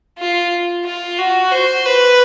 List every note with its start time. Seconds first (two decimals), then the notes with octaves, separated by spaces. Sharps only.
0.19 F4
0.85 F4
1.18 F#4
1.52 C5
1.85 B4